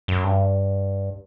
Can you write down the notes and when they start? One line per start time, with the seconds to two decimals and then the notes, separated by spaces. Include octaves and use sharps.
0.08 F#2
0.24 G2